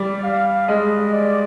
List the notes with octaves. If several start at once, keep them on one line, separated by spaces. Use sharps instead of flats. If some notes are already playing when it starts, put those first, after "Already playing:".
Already playing: G3 D5
F5
G#3 D#5
D5